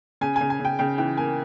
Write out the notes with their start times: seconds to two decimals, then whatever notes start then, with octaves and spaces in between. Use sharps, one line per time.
0.21 C#3 G#5
0.36 G#5
0.41 C#3
0.50 G#5
0.60 C#3 G5
0.79 C#3 G5
0.98 E3 G5
1.17 A#3 G#5